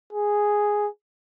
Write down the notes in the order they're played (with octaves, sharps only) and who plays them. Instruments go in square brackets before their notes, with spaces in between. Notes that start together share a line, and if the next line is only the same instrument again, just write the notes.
[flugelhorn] G#4